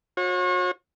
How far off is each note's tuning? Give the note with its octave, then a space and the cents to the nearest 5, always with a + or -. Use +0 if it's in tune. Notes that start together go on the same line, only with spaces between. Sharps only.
F#4 -40 C#5 -35